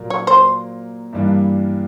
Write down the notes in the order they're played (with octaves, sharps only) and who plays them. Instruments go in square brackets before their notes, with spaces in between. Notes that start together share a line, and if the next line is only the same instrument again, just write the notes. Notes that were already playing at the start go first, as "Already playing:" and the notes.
Already playing: [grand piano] A#2 F#3 A#3
[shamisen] C#5
C5
[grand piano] G2 E3 G3 A#3 D4